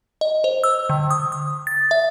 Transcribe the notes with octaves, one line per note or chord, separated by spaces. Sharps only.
D#5
C5
E6
D3
D#6
D#6
A6
E5